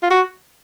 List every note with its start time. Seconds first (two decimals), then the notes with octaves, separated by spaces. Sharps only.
0.03 F4
0.10 F#4